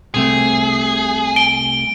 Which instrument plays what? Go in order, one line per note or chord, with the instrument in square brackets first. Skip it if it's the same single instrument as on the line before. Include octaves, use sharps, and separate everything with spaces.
[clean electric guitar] C2 C3 A3 [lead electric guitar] G#4
[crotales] D7 G7